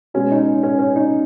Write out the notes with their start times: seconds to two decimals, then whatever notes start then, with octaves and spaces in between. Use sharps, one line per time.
0.14 B2 G#3 C#4
0.31 D#4
0.38 C#4
0.63 C#4
0.79 C#4
0.96 D#4